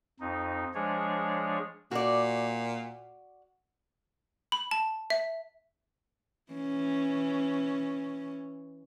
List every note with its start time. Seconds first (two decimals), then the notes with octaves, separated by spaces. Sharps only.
0.20 F2 D#4
0.74 F3 G#3 D4 G#4 C#5
1.91 A#2 F#4 D5
4.52 B5
4.71 A5
5.10 E5
6.52 E3 C#4